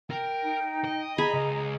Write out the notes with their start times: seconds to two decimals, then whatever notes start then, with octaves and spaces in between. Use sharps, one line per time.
0.10 A#4 G5
0.43 D#4
0.84 D#5
1.18 G#4 A#5 B5
1.34 C#2 D#5